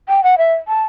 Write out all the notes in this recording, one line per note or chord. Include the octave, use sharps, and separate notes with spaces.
G5
F#5
E5
A5